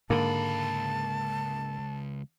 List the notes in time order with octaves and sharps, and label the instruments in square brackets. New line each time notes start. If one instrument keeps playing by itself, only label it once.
[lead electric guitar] C#2 B5 [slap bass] G#2 D3 [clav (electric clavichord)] A#3 [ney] A5